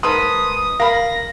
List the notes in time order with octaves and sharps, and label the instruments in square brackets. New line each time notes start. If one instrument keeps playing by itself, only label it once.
[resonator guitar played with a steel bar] G#2 B4 [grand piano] A#4 A5 C6 [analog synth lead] D#6
[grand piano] A#4 B5 [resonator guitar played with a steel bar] F5 [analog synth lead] A#6